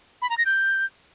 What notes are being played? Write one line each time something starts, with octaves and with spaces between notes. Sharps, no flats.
B5
A#5
A#6
G6